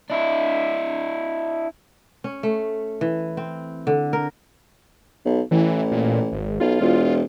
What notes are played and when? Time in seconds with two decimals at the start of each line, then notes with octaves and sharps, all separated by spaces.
0.10 D4 E4
2.24 C#4
2.43 A3
3.01 E3
3.37 C4
3.87 D3
4.13 A#4
5.25 B1
5.51 A1 E3
5.91 A#2
6.32 G#1
6.60 B1 F4
6.80 E1